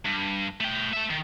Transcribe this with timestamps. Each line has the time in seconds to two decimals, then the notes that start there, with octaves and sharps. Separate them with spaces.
0.05 G2
0.60 A3 G5
0.93 A3 E5
1.10 D#3